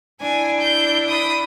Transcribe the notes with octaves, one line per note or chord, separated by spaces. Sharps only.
D4 E4 G#5
G6
B5 D#6